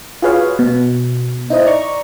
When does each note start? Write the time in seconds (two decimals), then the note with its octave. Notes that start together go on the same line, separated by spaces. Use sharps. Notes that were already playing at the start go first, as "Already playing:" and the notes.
0.22 F4 F#4 G#4 B4 C#5 F5
0.59 B2
1.50 D#4 E4 C5 D#5
1.66 D5 A#5 C#6